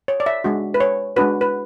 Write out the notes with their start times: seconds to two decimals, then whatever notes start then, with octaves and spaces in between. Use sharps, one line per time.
0.08 C#5
0.20 D5
0.26 E5
0.44 G#3 D4 F#4
0.74 B4
0.80 C#5
1.16 G#3 D4 F#4 B4
1.41 B4